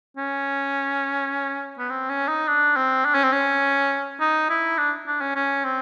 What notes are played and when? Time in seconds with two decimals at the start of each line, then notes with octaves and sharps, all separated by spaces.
0.17 C#4
1.79 B3
1.90 C4
2.10 C#4
2.28 D#4
2.48 D4
2.76 C4
3.05 D4
3.15 C#4
3.23 C4
3.33 C#4
4.20 D#4
4.50 E4
4.78 D4
5.07 D4
5.21 C#4
5.36 C#4
5.64 C4